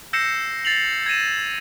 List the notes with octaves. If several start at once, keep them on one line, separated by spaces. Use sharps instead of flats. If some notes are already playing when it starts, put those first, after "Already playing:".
E6 G6 A#6 C7 C#7 E7
A6 C7 F7 F#7
G#6 A#6 D#7 E7